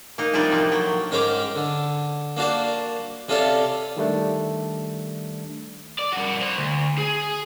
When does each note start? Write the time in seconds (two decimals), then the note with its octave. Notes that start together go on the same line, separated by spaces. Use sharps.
0.18 A#3 D#4
0.33 C3 F3 G3 D4 D#4
0.51 A2 F3 A#3
0.72 F#3
1.11 G#2 C#4 A#4 C5 G5 D6
1.56 D3
2.37 A#3 D4 F#4 C5 D5
3.29 C3 C#4 F4 A4 D5
3.97 D#3 G3 A3 D4
5.98 D5
6.12 G2 F#4
6.41 C5 D5
6.58 D2
6.98 G#4